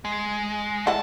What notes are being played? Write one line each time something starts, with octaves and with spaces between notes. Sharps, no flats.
G#3
E4 D#5 F#5 A5